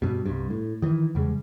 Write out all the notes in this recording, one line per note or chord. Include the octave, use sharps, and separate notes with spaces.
G2 B2
C2 G2
A2
D#3 E3
E2 C#3 G3 G#3